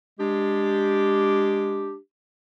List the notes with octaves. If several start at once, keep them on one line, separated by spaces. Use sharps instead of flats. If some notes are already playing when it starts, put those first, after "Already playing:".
G#3 D4 G4